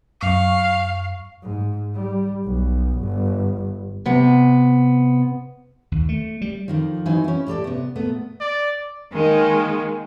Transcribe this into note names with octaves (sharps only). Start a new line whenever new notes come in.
F#2 F5 C#6
G#2
G3
B1
G1
C3 B3
D#2
A3
G3
F2 D#3 F3
E3 F#3 C4 D#4 G#5
C#4 E4
A2 G4 A4 D5
C3 B3
A#2 A3 B3
D5
D#3 G#3 A#3